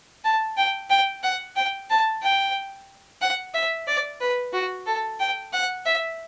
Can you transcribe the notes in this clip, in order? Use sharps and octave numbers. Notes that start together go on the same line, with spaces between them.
A5
G5
G5
F#5
G5
A5
G5
F#5
E5
D5
B4
F#4
A4
G5
F#5
E5